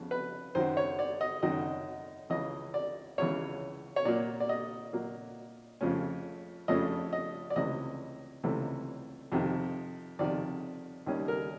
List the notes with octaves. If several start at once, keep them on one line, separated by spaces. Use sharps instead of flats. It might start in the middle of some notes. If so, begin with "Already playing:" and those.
Already playing: F2 C#3 B3
B4
F#2 D#3 F#3 C5
C#5
D5
D#5
F#2 D#3 F#3 D#5
C#2 C#3 E3 D#5
D5
C#2 C#3 E3 C#5
C#5
A#2 F#3 A#3 D5
D5
D#5
A#2 F#3 A#3
F2 C#3 F3 A3 C#4
F2 C#3 F3 A3 C#4 D#5
D#5
D5
C#2 C3 E3 A3 D#5
C#2 C3 E3 A3
F2 C3 D#3
F2 C3 D#3 D5
D#2 D#3 G3 A#3 C#4
A#4